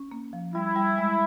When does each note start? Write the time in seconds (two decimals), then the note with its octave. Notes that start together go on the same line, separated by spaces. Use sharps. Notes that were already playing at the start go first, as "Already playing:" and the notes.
Already playing: C#4
0.12 A#3
0.33 F3
0.54 G3 E4
0.76 G3
0.98 G#3